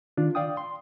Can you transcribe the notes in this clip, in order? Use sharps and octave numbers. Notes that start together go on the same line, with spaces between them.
D#3 D4 F4
D5 F5 G5 D#6
C6